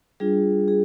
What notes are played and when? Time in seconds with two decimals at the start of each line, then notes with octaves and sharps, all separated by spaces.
0.20 G3 D4 F4 G#4
0.68 G#4